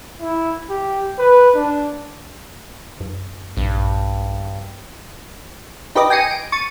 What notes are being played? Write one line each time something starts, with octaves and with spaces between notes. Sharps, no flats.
E4
G4
B4
D4
F#2
A#1 G2
D#4 G4 B4 D5 D#5
G5 G#5 A#6 C7 C#7 D#7
D7
C#6 A6 D#7